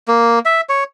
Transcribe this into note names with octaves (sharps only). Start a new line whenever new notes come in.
A#3
E5
C#5